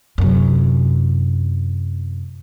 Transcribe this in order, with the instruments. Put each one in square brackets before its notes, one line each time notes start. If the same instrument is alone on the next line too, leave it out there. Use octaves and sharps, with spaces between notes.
[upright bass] F#2 C3